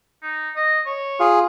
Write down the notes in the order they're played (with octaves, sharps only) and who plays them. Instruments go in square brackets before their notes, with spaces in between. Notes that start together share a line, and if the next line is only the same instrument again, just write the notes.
[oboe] D#4
D#5
C#5
[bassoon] F4 [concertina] G#4